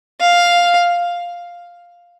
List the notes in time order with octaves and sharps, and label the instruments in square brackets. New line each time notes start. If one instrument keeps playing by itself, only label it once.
[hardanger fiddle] F5